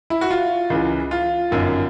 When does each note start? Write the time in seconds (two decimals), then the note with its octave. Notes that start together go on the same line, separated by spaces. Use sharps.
0.10 E4
0.21 F#4
0.30 F4
0.70 C#2 C#3 E3
1.11 F4
1.51 G1 F#2 D#3